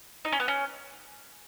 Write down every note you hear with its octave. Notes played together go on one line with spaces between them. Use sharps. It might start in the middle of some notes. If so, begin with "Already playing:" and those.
D#4
C#4
B3
C#4